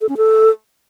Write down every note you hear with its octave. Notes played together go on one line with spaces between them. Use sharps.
A4
C#4
A4